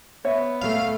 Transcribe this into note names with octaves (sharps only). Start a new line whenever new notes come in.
B3 C#5 E5
A3 F5